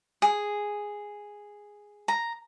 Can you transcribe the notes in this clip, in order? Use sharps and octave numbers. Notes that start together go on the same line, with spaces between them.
G#4
A#5